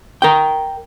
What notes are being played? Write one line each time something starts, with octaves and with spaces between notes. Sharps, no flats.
A#4 G5